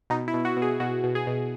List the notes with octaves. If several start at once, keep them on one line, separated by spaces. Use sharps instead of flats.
B2 D#4
E4
B2
F#4
B2
G#4
B2 F#4
B2
G#4
B2